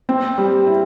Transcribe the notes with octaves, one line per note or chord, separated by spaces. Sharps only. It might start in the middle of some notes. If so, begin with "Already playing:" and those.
C4
G3
E4